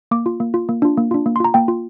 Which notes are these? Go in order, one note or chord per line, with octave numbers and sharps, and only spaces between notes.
A#3 D6
F4
A#3
F4
A#3
D4 F4
A#3
D4 F4
A#3
C6
F4 A#5
A#3 G5
F4